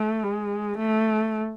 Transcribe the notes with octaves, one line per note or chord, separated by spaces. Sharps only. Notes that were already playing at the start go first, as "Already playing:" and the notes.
Already playing: A3
G#3
A3